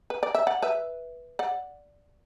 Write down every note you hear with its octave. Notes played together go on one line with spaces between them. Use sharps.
B4
D5
E5
D5 F#5
B4 E5
D5 F#5